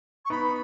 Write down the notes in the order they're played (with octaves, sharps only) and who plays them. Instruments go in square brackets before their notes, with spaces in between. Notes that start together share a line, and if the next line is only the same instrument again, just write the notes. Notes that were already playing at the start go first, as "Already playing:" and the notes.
[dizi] C#6
[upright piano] B3 D#4 [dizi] B5